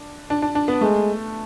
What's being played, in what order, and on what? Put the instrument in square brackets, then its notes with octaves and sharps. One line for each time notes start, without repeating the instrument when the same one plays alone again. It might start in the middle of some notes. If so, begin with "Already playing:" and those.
Already playing: [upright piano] D4
D4
D4
D4
B3
[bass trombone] G#3 [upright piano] A3